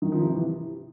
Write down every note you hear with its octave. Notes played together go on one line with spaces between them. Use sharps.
D#3
F3
C3
E3